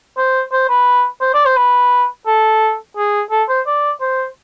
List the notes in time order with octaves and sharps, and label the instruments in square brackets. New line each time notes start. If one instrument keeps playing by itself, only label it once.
[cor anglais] C5
C5
B4
C5
D5
C5
B4
A4
G#4
A4
C5
D5
C5